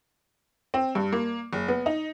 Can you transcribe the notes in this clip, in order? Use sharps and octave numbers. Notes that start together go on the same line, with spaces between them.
C4
G2
A#3
F#1
B3
D#4